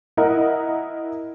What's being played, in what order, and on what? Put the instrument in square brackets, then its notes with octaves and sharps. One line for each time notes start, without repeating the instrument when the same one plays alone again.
[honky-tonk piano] E4 A#4 D#5 F#5